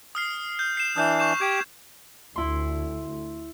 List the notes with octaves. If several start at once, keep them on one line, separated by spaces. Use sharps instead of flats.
D#6 F6 C7
G6
C7 E7
E3 D4 D#6 G6 E7
C#6 G6 E7
G4 D6 G#6
D2 E4 C6